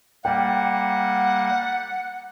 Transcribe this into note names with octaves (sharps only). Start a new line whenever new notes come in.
G3 A#3 F#5 G5